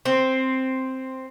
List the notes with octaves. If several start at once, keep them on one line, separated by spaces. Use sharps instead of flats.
C4